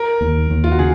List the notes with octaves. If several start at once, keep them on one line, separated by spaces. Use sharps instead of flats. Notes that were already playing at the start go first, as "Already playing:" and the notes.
Already playing: A#4
D#2
D#2
F4
F#4
C#3 G#4